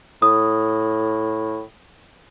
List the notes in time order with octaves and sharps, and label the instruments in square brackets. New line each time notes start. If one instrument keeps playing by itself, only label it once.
[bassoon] A2 [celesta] D#6